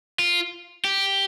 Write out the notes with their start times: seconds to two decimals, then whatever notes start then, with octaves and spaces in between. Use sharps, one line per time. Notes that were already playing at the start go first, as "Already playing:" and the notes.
0.19 F4
0.85 G4